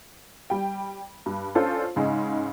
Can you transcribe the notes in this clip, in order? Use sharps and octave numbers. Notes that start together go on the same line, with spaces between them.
G3 G5
G2
C#4 D4 F4 A4 C5
G#2 C#3 G#3